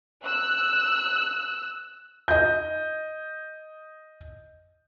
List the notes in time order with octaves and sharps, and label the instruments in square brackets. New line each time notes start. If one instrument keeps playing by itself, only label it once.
[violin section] E6 F#6
[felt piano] D#5 G6